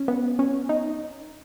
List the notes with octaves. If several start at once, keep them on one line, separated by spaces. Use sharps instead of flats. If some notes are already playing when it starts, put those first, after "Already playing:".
Already playing: C#4
B3
C#4
D#4